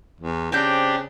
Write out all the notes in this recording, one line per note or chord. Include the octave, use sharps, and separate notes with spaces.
E2
C#3 C4 D4 G4 G5 G6